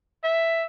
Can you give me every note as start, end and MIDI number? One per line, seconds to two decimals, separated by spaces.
0.24 0.65 76